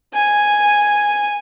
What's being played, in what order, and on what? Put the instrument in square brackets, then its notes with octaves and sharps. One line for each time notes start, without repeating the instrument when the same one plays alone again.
[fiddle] G#5